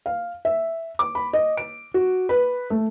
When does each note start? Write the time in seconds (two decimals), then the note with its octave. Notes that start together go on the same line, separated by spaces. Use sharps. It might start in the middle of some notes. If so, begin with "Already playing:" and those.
0.06 F5
0.45 E5
0.99 D6
1.15 B5
1.33 D#5
1.57 D7
1.94 F#4
2.29 B4
2.70 A3